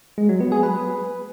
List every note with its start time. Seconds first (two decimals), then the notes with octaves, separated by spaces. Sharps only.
0.18 G#3
0.29 F#3
0.40 B3
0.52 G#4
0.63 B4